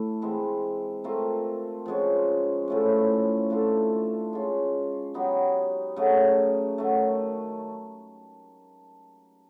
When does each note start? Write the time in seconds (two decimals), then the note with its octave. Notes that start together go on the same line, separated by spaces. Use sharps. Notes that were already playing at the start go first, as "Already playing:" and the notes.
Already playing: A2 A3
0.22 E3 G#3 C4
1.04 A3 C4 F4 A#4
1.86 F3 G#3 C#4
2.68 A2 F3 A3 C#4
3.50 A3 D4 F4 A4
4.33 G#3 C#4 F4
5.14 F#3 B3 D#4 G4
5.96 C#3 F#3 A3
6.78 D#3 F#3 A3